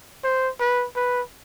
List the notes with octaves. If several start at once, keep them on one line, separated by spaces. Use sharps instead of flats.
C5
B4
B4